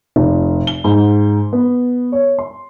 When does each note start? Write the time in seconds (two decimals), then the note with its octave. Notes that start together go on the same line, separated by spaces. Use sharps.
0.16 F1
0.67 G7
0.84 G#2
1.53 B3
2.12 C#5
2.39 C6